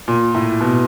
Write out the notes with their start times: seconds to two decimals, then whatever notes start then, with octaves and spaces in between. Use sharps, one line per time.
0.08 A#2
0.35 A2
0.61 B2